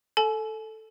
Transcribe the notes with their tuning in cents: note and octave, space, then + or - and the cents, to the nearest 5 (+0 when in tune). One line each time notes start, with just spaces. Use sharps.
A4 +0 G#5 +45